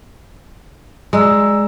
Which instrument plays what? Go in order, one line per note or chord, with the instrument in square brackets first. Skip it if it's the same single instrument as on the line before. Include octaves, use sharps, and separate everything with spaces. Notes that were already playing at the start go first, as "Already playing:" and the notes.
[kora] G#3 [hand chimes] D5 A#5 E6